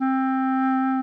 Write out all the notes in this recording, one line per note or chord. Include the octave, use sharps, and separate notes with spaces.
C4